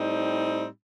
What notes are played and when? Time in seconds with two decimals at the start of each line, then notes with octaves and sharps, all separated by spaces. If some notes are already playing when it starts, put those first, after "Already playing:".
Already playing: A2 G3 C4 D#4